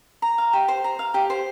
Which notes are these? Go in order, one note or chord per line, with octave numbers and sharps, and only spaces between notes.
A#5
F5
G4
C5
A#5
F5
G4
C5